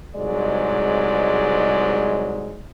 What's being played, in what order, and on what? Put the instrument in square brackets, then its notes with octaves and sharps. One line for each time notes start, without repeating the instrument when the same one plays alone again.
[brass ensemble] C2 G#2 F#3 G#3 D5